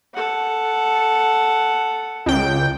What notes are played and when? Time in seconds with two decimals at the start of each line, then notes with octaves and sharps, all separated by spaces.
0.14 A4 F#5
2.26 C#2 G5